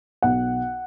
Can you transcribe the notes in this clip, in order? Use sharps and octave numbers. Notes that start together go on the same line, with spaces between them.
B1 F#5